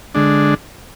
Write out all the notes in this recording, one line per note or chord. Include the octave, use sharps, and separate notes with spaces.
D3 G#3 D4